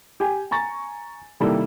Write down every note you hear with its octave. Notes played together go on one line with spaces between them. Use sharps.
G4 G5 G#5
G#5 A#5 C#6 A6
C3 D#3 G3 A#3 E4 A4